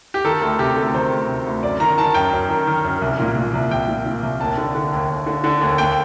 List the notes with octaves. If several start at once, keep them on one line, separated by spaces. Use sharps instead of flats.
G4
D#3 A4
D2 A4
C3 G4
D2 A4
D#3 C5
D2
C3
D2
F#2 D5
D#3 A#5
D#3 A5
F#2 G5
F#2
D#3
D#3
F#2
C2
A#2
A#2
C2
C2 G5
A#2
A#2
C2
D#2 A5
D3
D3
D#2
D#2
D3
D3
D#2
D#2 G5